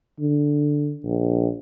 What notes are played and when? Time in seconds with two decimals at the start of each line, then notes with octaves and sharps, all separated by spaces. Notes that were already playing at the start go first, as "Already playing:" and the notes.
0.19 D3
1.04 A#1